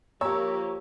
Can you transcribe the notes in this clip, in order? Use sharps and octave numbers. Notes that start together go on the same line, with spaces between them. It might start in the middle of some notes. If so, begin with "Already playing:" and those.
F3 A#3 G4 C#5 A#5 E6